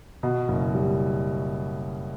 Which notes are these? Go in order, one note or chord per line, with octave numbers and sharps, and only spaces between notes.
B2
F#1
G3